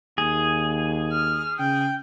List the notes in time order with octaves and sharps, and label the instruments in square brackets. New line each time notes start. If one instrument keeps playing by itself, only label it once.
[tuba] D#2 [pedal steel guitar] G#4
[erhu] F6
[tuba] C#3 [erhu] G5